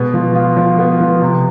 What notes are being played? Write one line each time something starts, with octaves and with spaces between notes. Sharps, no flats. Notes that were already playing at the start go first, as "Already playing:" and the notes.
Already playing: B2 G#3 B3
F3
F4
F3
B3
F3
C3